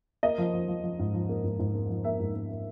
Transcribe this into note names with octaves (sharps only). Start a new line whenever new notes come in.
A#3 D#5
F3
F3
F3
F3
G#2
F3
A#3
G#2
G#2
A#3
F3
A#3 E5
G#2
A#3
A#3